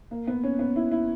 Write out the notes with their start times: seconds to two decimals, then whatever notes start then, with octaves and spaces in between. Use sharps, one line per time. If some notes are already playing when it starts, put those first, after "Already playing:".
0.11 A#3
0.27 B3
0.44 C#4
0.59 B3
0.76 E4
0.92 E4